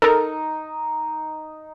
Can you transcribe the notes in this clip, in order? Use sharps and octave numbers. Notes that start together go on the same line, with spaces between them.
D#4 A4 A#4